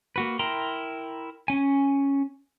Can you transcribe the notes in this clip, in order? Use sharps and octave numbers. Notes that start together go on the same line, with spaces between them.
A#3 F#4 B4
E4 A#4 G5 A#5 C6
C#4 G#5